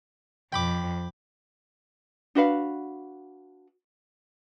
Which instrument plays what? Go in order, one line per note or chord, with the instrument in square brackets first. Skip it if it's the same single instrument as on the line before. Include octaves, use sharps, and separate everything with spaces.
[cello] F2 [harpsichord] G5 B5 D6
[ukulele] D4 F#4 B4 F5